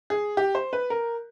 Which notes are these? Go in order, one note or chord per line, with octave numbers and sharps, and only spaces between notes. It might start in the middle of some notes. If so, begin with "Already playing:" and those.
G#4
G4
C5
B4
A#4